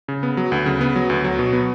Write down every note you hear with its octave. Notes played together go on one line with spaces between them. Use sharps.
C#3
B3
F#3
D2
C#3
B3
F#3
D2
F#3
B2
B3